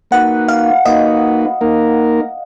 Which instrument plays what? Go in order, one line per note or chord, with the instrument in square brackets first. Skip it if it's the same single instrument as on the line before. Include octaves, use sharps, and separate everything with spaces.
[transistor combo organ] A#3 D#4 F#4 B4 [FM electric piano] F#5
[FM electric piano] F5
[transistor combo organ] A#3 D#4 F#4 B4 [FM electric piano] D#5
[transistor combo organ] A#3 D#4 A#4